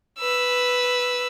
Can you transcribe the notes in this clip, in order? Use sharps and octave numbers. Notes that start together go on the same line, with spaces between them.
B4 E6